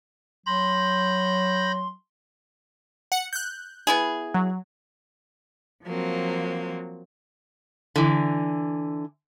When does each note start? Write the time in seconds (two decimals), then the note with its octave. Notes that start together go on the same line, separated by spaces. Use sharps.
0.46 F#3 B5 C6 G6 A#6
3.12 F#5 C#7
3.33 F#6 G6
3.87 B3 E4 G#4
4.34 F#3
5.84 F3 F#3 A#3 C4
7.96 D3 E3